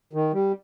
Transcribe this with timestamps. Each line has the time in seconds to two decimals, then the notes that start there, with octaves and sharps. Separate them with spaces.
0.13 D#3
0.34 G3